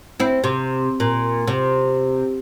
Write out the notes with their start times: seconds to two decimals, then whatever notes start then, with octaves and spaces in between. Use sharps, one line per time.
0.20 C4 E4
0.44 C3
1.00 A#2
1.47 C3